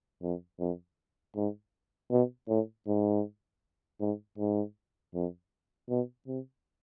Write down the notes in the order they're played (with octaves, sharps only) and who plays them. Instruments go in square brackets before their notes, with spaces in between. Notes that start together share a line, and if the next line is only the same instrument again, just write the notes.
[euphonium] F2
F2
G#2
B2
A2
G#2
G#2
G#2
F2
B2
C3